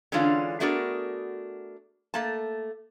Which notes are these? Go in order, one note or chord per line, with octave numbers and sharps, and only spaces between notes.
D3 E3 G#3 C#4 D4 F4
A3 B3 D4 F#4 G#4 A#4
A3 A#3 A5